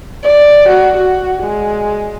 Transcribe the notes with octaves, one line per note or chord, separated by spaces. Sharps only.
D5
F#4
F#4
G#3